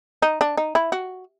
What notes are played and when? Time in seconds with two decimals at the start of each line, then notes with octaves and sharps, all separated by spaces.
0.22 D#4
0.41 D4
0.57 D#4
0.75 E4
0.92 F#4